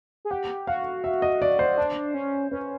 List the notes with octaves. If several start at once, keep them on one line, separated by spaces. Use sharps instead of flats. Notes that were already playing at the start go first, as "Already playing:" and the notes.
G#4
G4 F#5
F#4 F5
E5
D#5
D5
C5
D4
C#4
C#4 B4